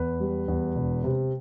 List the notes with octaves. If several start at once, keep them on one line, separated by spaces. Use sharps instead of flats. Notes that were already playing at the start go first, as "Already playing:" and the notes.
Already playing: E2 B4
G3
E2
E1
C3